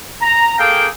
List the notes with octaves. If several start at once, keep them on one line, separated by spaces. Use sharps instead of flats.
A#5
A#3 G#4 A4 F5 G5